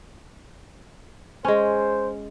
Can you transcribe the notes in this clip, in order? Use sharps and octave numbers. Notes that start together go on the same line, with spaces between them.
G#3 C#4 C5